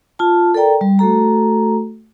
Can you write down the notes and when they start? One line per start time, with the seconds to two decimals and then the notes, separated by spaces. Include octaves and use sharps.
0.19 F4 A5
0.54 A4 A#4 D5 G5 A#5
0.81 G3
0.99 A3 F#4 A4 A#5